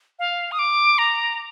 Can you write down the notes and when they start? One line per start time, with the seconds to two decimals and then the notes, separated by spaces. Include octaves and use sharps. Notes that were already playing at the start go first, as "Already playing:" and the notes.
0.19 F5
0.52 D#6
0.59 D6
0.98 A#5